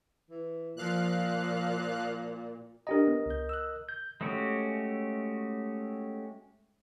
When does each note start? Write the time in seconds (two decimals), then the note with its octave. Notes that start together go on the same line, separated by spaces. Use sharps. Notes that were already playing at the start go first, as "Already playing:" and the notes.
0.31 E3
0.77 A#2 F3 F5 F#6
2.87 D4 G4 A#4 D#5 A#5
3.08 B3
3.26 C#2 G6
3.49 E6 F#6
3.89 G6
4.21 G#3 A3 C#4 F#4 G4